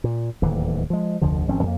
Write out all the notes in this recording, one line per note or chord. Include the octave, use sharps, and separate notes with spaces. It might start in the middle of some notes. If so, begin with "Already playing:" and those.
A#2
D1 D#2 D3 E3
F3 G#3
F1 D2 D3 F3
G#1 F3 C4 C#4
F2 A#3